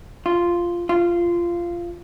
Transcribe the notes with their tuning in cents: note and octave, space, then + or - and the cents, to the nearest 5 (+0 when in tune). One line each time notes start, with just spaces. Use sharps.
F4 -5
F4 -15